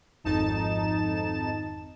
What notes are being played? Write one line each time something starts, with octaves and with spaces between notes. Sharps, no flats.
G#1 F2 D#4 A5 E7